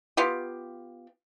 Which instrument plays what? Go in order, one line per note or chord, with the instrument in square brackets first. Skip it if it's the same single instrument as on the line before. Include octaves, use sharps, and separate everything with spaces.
[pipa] B3 F4 G4